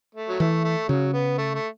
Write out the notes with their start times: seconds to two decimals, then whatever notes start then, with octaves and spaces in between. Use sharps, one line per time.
0.15 A3
0.29 F#3
0.40 E3 A3
0.64 A3
0.89 C#3 F#3
1.13 B3
1.38 A3
1.54 A3